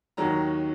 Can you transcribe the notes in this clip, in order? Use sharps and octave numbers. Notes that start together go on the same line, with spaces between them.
D#2 D#3 F#3 A#5